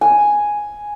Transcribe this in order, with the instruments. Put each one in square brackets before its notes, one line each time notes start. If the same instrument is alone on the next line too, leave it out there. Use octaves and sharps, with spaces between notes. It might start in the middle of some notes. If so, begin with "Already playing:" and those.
[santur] G#5